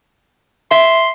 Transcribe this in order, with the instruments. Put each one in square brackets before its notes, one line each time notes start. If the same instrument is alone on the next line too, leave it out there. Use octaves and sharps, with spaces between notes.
[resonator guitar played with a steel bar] E5 [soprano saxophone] C6